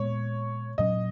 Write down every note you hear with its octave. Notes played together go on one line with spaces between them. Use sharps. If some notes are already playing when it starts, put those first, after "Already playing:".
Already playing: A#2 G#3 B3 C#5
A#2 F#3 C#4 D#5